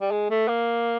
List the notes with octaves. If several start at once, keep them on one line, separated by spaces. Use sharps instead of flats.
G3
G#3
A3
A#3